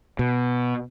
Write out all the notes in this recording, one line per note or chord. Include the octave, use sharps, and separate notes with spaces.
B2